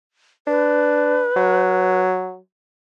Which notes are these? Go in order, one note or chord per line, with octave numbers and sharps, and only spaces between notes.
D4 B4
F#3